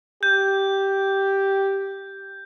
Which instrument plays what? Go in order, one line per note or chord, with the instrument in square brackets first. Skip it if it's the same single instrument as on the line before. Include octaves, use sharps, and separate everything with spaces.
[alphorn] G4 [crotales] G6